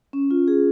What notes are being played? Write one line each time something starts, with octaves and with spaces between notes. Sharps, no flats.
C#4
F4
G#4